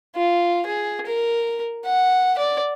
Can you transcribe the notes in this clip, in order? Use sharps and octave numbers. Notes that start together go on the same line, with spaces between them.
F4
G#4
A#4
F#5
D5